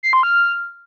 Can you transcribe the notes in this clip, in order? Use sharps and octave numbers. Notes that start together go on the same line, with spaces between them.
C7
C6
F6